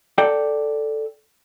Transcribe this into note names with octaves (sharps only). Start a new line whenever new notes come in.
A4 D5 G5